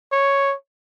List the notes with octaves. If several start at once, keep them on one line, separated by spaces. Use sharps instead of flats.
C#5